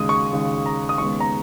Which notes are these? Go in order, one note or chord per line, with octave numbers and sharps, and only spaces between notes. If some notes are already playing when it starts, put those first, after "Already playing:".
Already playing: D#2 C#3 G#3 D#6
C#6
D#2 C#3 G#3
A#5
D#6
D#2 C#3 G#3 B3 C#6
A#5